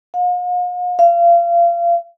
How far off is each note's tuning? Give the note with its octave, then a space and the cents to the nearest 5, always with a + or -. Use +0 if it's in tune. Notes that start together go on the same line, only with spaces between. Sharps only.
F5 +45
F5 -30